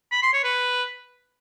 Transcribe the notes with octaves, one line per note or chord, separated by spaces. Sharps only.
B5
C6
C#5
B4